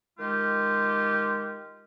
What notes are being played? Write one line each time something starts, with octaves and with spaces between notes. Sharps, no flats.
D#3 G#3 F4 G4